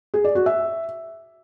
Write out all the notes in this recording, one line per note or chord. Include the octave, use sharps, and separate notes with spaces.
G#4
D5
F#4
E5